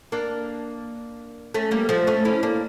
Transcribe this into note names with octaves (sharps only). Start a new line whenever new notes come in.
A#3 D4
A3 C#4
G3 A#3
F3 A3
A3 C#4
C#4 E4
A#3 D4